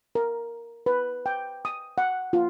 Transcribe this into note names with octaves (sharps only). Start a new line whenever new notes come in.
A#4
B4
G5
D#6
F#5
F4